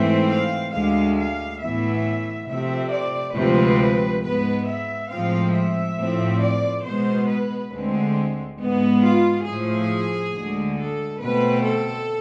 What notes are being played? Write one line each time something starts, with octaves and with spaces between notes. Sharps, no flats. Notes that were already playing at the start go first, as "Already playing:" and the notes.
Already playing: G#2 E3 A3 C4 E5
F5
D2 D3 G#3 F5
F5
A2 E3 B3 E5
C3 F3 A3 C4 E5
D5
D2 C3 F3 G#3 C4 B4
G#2 G#3 B3 B4
E5
A2 F3 G#3 C4 F5
E5
A2 F3 A3 C4
D5
B2 G#3 B3 C5
B4
D2 D3 G#3 C4
G#2 G#3 B3
F4
A2 F3 A3 G#4
D2 D3 G#3
A4
B2 A3 C4 B4
A4